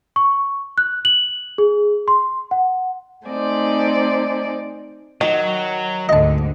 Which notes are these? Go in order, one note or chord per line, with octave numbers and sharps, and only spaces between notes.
C#6
F#6
F#7
G#4
C6
F#5
A3 C4 D#4 C5 D5 G#5
D#3 F#3
D2 G#2 D3 D#5 A5